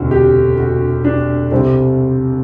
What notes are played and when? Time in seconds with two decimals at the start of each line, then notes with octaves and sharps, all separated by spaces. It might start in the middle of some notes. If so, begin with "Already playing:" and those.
Already playing: E1 D2 C3 F#4
0.11 G4
0.58 F#4
1.05 D4
1.51 C2 C3 G3 C4